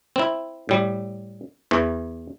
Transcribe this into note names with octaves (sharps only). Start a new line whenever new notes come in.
C4 E4
A2 G3
E2 E3